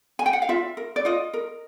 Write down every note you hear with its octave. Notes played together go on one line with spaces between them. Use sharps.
G#5
G5
F#5
F5
F4 E5
A#4
D5
F4 D#5
A#4